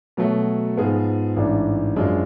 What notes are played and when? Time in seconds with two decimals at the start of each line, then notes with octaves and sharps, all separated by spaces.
0.17 B2 F#3 A3
0.77 G#2 F3 B3 F4 G#4
1.36 A1 G#2 G#3 D4
1.96 F#2 F3 G#3 D4 F4